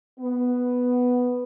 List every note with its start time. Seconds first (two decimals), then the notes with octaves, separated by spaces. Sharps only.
0.19 B3